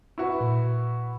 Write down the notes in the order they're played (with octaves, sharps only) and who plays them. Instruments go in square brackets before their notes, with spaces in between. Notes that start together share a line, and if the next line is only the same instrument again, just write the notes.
[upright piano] E4 F#4 B4
[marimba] A#2